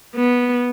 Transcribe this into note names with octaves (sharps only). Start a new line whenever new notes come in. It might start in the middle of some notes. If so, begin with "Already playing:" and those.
B3